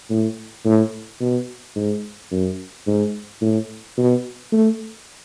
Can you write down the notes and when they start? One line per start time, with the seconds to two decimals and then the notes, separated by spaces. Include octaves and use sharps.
0.10 A2
0.65 A2
1.21 B2
1.76 G#2
2.32 F#2
2.87 G#2
3.42 A2
3.97 B2
4.52 A3